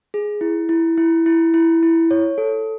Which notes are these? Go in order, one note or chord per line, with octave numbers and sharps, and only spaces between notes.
G#4
E4
E4
E4
E4
E4
E4
C#5
A4